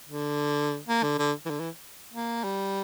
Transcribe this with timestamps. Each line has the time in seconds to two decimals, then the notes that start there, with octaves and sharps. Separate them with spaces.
0.09 D3
0.88 A#3
1.03 D3
1.19 D3
1.46 E3
1.50 D3
1.60 E3
2.13 A#3
2.44 G3